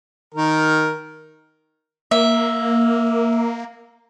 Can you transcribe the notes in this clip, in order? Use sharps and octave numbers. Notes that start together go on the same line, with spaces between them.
D#3 A#4
A#3 E5